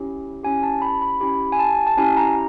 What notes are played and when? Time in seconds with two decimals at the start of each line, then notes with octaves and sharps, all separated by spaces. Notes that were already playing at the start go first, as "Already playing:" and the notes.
Already playing: C#4 E4 G4
0.43 C#4 E4 G4 G#5
0.63 A5
0.82 B5
1.02 B5
1.21 C#4 E4 G4 B5
1.52 G#5
1.59 A5
1.87 A5
1.97 C#4 E4 G4 G#5
2.17 A#5